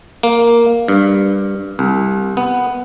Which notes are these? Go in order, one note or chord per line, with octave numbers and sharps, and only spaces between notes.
A#3
G2
C2
B3